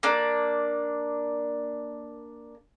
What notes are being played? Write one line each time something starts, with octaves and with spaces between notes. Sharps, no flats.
A#3 D4